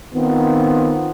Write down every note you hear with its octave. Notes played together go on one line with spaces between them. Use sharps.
D#3 B3 C4 F4